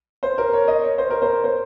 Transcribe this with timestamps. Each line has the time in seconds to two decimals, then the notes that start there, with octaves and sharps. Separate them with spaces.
0.23 C5
0.38 A#4
0.53 C#5
0.68 D#5
0.83 C#5
0.98 C5
1.10 A#4
1.22 C5
1.44 C5